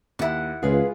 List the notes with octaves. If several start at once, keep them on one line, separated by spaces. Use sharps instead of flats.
D#2 E4 F#5
C#2 G#3 F4 G#4 B4 F5